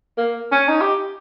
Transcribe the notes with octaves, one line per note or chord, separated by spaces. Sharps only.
A#3
C#4
D#4
G4